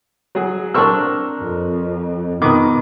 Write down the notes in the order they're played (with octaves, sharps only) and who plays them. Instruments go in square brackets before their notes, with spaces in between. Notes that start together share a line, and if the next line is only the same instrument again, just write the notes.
[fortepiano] F#3 G#4
[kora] C4 D4 [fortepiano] A#4 C#6 E6
[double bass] F2
[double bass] B2 [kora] D#3 B4 [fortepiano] D6 D#6